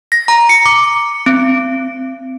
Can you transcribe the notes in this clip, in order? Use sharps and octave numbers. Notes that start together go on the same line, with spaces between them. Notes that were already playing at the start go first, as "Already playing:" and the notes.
A#6
A#5
C#7
D6
C4